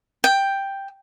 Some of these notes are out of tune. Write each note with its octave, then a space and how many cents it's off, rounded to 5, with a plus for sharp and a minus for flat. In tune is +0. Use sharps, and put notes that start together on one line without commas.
G5 +5